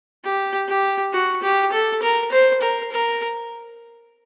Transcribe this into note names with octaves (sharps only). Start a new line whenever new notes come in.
G4
G4
F#4
G4
A4
A#4
C5
A#4
A#4